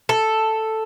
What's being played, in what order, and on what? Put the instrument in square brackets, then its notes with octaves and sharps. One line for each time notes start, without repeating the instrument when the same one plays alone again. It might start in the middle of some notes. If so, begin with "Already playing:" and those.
[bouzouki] A4